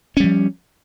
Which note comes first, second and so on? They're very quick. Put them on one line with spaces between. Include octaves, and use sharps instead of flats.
C#4 G3 F3